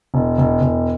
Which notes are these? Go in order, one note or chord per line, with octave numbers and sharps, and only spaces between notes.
E1
E1
E1